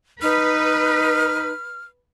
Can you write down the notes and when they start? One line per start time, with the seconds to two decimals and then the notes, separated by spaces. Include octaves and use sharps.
0.22 D#4 B4 F6